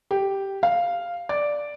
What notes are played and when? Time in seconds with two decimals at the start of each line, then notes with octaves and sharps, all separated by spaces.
0.11 G4
0.63 F5
1.29 D5